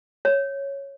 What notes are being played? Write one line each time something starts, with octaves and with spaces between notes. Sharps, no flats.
C#5